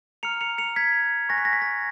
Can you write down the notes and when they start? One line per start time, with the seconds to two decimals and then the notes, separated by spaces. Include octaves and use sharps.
0.23 A#5 F6 C#7 F7
0.41 C#7 F7
0.58 C#7 F7
0.76 G#6 B6
1.29 G#5 C#6 F#6 A#6
1.38 B6
1.45 A#6
1.53 B6
1.62 A#6